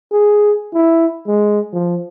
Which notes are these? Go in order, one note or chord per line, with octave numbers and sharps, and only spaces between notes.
G#4
E4
G#3
F3